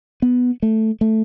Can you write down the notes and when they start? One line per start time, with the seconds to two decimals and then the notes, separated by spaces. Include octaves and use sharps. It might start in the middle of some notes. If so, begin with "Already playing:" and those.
0.22 B3
0.63 A3
1.01 A3